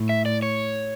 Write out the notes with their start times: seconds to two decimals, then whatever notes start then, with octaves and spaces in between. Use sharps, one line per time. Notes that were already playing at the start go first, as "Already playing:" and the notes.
Already playing: A2
0.09 E5
0.26 D5
0.42 C#5